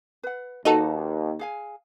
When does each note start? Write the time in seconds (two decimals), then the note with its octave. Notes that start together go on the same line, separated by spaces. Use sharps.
0.23 B4 F#5
0.65 D#2 D#4 F#4 A4 B4 F#5 A5
1.39 G#4 F5 G#5